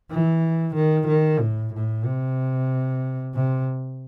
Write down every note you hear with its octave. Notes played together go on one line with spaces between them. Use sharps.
E3
D#3
D#3
A2
A2
C3
C3